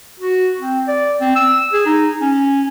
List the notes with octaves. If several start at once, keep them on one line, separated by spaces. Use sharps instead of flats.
F#4
C4
D5
C4
E6
G#4
D#4
C#4